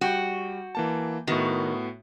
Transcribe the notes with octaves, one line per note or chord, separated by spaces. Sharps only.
G3 F#4 G5 G6
E3 A#3 A5
A2 D#3 B3 F#4